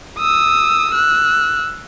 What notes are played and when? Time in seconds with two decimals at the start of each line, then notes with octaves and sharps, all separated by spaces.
0.18 D#6 E6
0.91 E6 F#6